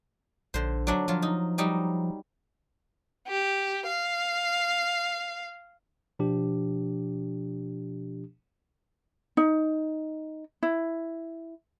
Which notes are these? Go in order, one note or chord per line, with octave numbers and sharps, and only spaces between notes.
A#1 D3 C5
F#3 D4 E5
F3 F#3 F4
D#4
F#3 G3 D#4
G4
F5
B2 F3 D4 G4
D#4
E4